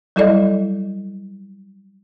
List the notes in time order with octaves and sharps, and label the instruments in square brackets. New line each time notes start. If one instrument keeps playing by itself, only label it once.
[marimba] F#3 G3 E4 A4 D5 D#5